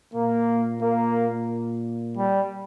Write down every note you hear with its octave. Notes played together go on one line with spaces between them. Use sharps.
A#2 A#3
A#3
G3